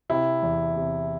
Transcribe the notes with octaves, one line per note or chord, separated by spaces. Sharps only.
C3 E4
E2
C3